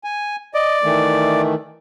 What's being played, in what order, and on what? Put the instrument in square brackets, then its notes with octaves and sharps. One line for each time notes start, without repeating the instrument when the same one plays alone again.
[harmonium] G#5
[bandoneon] D5 [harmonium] D#5
[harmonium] D#3 E3 A3